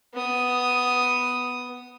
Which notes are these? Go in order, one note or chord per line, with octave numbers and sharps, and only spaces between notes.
B3 D#6